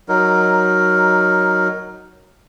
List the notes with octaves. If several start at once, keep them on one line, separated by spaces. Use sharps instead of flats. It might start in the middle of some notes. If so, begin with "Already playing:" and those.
F#3 D#4 A#4